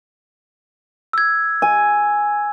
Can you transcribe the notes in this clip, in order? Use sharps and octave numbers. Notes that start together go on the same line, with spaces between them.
E6 G#6
G#5